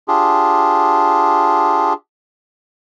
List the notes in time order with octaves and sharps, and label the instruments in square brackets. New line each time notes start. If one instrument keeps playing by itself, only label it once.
[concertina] D4 F4 G4 G#4